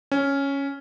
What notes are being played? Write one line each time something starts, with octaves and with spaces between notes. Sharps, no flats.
C#4